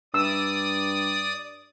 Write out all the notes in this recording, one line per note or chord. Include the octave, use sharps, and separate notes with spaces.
G2 D5 D#6 E6